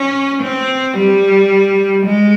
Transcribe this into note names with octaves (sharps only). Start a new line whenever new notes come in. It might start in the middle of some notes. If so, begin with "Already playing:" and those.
Already playing: C#4
C4
G3
G#3